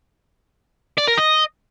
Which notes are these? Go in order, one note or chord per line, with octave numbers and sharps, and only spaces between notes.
D5
A#4
D#5